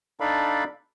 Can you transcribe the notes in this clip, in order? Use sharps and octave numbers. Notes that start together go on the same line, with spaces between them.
D4 D#4 A4 D5 F5 B5